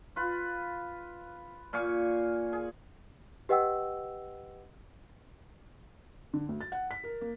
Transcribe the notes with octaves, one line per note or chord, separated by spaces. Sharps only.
F4 B4
A#2 F5 G#5 C#6
G#4
G4 B4 D#5 F#5 G5 E6
D3
D2
A6
F#5
B6
A#4
A#3